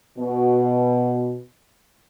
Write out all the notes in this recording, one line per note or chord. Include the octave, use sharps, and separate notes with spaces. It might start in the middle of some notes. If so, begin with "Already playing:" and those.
B2